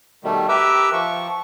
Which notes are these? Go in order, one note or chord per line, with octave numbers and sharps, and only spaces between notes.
B2 D#3 G3 A3
G4 A#4 B4 E5 D6 E6
F3 C#6